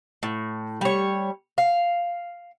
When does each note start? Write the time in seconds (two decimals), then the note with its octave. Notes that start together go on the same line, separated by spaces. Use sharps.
0.23 A2
0.81 G3 C#5
1.58 F5